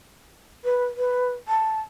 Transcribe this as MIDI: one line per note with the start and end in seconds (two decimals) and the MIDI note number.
0.64 0.84 71
0.97 1.29 71
1.48 1.80 81